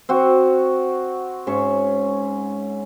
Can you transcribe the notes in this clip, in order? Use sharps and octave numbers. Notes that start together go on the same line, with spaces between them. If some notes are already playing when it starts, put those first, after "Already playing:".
C4 F#4
G#2 C#4 E5 C#6